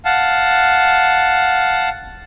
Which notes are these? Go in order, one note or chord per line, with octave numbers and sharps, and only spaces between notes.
F5 F#5 A5